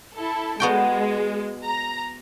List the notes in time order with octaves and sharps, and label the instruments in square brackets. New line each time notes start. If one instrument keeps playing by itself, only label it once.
[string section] E4 A4
[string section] G#3 [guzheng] B3 F#4 G5
[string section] A#5